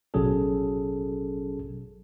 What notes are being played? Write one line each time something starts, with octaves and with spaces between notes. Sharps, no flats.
A1 B2 F#3 C#4 G#4 A4